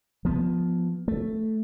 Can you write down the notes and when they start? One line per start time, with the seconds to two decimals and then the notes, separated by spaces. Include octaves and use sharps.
0.25 F3 B3
1.08 A3